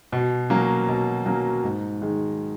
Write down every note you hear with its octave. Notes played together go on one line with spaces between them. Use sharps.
B2
F#3 A#3 C#4
B2
F#3 A#3 C#4
G#2
D#3 G#3